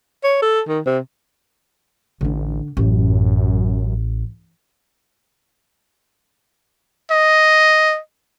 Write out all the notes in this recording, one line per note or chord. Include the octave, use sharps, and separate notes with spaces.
C#5
A4
D#3
C3
A1 D3 D4
A1 F#2
D#5